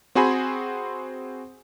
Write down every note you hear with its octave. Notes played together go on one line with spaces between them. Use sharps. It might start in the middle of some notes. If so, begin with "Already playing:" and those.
C4 F#4 G#4 C5 G#5 B5